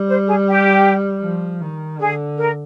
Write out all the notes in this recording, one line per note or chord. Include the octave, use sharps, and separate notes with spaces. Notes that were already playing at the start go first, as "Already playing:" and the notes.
Already playing: G3
C5
G#4
G4
F3
D#3
D3 G#4
A#4